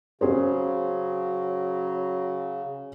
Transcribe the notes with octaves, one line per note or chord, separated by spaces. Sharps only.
C#3 F#3 C#4 G#4 C5